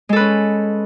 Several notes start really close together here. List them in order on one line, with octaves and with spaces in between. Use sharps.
G#3 A4 B4 C#4